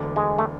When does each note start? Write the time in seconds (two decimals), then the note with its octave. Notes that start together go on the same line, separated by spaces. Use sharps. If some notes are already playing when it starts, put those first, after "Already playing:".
Already playing: E1 D2 D3
0.16 G#3
0.39 A3